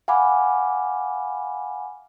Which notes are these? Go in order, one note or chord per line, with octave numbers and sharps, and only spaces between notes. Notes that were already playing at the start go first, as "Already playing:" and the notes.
F5 F#5 G#5 B5 D6